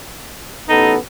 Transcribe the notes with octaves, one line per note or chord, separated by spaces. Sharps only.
A1 B3 D#4 A4